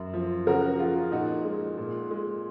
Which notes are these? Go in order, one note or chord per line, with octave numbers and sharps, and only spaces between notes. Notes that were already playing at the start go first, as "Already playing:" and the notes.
Already playing: F#2
F3
C#3 F#4 A#4
F#4
F3 F4 G#4
A#2 D#4 F#4
G#3
A#2
G#3